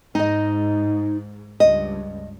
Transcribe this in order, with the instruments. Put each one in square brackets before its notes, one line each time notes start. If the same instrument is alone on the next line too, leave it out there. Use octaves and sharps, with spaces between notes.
[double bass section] G#2 [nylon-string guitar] D#4 D#5
[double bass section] C#2 G2 [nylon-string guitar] D#5